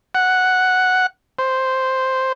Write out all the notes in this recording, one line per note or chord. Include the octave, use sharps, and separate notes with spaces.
F#5
C5